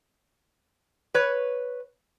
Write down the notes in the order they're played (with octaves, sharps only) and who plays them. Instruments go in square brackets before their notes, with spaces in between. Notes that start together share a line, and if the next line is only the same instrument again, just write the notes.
[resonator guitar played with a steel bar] B4 C#5